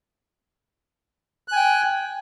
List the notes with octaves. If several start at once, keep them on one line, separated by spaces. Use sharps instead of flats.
G5 G#5 F#6